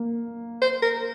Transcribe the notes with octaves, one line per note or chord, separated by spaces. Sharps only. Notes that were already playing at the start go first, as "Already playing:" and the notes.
Already playing: A#3
C5
A#4